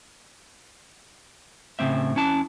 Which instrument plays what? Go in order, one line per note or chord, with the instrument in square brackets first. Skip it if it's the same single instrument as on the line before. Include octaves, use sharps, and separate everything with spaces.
[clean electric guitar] A2 C#3 A#3 C4 E5
F2 C#4 E4 A5